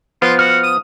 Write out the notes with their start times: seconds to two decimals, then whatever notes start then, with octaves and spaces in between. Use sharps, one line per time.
0.22 F3 B3 F4
0.39 F#4 F6
0.63 D#6